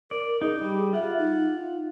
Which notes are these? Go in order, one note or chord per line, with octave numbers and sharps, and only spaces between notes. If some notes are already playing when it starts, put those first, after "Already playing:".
A#4 D5
D#4 G#4
G3
F4 E5 F#5
D#4